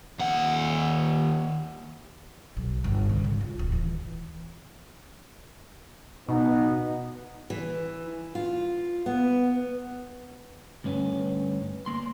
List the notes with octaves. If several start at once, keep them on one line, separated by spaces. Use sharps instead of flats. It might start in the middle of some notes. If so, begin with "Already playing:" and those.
D#2 F#5
B1
G1
C#3
G#1
F4
D1
E3
B2 B3 D#4
E3
F4
B3
D2 G2 C#4 B4
A#3 C6